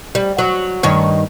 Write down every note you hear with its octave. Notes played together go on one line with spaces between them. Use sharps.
G3
F#3
G2 D#3 C#5